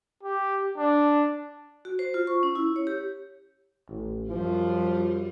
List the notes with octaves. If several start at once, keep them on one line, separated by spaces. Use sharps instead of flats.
G4
D4
F#4
C5
F4
C#6
C#4
E4
C#5
G4
A1
F#2 F3 G3 F4